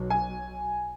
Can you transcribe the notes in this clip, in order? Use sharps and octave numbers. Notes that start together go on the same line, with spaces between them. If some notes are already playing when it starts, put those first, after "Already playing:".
Already playing: B1 B2 F#3
G#5